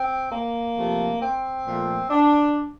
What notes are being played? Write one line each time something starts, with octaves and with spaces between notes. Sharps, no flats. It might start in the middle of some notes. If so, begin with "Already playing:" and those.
Already playing: C4
A#3
C3 F3 A3
C4
A#2 F3 A3
D4